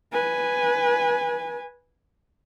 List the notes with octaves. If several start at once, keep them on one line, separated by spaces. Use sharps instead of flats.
B4 G#5